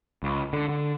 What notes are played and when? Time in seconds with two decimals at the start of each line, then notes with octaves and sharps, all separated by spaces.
0.23 C#2
0.53 D3
0.69 D3